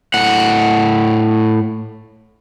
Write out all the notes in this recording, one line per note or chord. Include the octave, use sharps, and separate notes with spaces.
A2 F#5